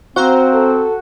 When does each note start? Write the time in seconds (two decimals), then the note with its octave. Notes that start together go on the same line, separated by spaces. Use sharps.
0.16 C4 F#4 C5 F5 A#5
0.54 A4